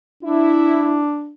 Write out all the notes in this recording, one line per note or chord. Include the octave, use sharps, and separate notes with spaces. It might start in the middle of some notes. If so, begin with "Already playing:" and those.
D4 E4